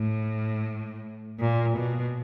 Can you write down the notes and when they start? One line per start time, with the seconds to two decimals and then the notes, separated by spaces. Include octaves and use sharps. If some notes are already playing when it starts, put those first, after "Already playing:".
Already playing: A2
1.40 A#2
1.77 B2